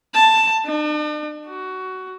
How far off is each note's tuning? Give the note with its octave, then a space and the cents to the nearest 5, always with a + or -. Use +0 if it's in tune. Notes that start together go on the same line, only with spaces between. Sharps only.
A5 +10
D4 +45
F#4 +15